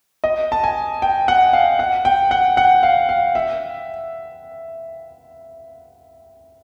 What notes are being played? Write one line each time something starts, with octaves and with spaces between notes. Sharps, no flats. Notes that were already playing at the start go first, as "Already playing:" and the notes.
D#5
A5
G#5
G5
F#5
F5
F#5
G5
F#5
F#5
F5
F5
E5